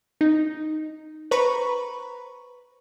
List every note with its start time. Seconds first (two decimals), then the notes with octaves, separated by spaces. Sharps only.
0.21 D#4
1.31 B4 C5 A#5 B5 C#6